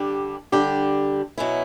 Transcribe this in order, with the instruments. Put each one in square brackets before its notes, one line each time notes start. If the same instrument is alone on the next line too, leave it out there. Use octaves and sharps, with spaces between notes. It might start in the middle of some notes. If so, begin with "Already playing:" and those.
Already playing: [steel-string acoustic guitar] D3 G3 D4 G4
D3 G3 D4 G4
B2 F#3 C#4 E4